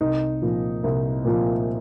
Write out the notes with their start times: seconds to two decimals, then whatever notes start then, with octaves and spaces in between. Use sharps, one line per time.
0.01 C2 D#4
0.42 A#2 F3
0.84 C2
1.25 A#2 F3